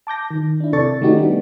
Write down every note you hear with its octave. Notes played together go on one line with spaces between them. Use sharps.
A5 D6 G6 A#6
D#3
D4 E4
C3 A4 D5 C#6 A6
D#3 A3 C#4 D#4 F#4 G4
G3 A3 B3 D4